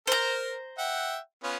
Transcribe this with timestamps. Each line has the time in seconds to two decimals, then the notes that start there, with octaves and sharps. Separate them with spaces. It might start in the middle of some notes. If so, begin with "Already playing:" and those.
0.07 A#4 C5 A#5
0.78 E5 F#5 G5
1.43 B3 C#4 F4